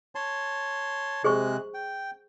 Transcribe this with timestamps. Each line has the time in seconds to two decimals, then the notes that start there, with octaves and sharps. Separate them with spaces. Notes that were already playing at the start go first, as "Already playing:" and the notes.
0.15 C#5 A5 C6
1.24 C3 G#3 G#4 C5 C#6 F#6
1.74 G5